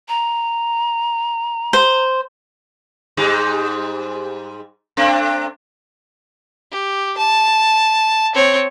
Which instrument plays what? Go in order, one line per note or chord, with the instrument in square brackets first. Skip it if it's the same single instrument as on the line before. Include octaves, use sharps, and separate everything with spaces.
[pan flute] A#5
[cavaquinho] C5
[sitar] G#2 G3 D#4
A3 C4 D4
[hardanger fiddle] G4
A5
C4 C#5